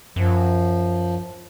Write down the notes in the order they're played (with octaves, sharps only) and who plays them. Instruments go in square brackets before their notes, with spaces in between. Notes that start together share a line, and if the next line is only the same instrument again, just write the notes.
[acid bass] F#2 [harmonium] F3